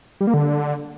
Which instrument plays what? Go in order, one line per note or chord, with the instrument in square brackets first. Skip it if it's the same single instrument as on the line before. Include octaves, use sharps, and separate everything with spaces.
[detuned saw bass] G3
A#3
D3